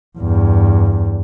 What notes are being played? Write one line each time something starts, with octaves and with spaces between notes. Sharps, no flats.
E2 G2